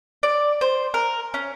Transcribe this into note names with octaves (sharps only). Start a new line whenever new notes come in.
D5
C5
A#4
C#4